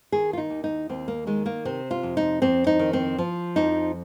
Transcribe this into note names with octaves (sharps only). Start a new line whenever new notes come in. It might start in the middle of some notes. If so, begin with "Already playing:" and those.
D#3 G#4
F4
D#4
D#2
D#4
D#2 C4
A#3
D#3 G#3
A#3
C3 C4
F4
F2
D#4
F2 C4
D#4
D#3
C4
F3
F2 D#4